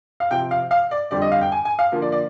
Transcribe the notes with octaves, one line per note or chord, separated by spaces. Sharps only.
F5
C3 F3 C4 G5
F5
F5
D5
F2 D3 G3 C4 D5
D#5
F5
G5
G#5
G#5
F5
D3 F3 A#3
D5
D5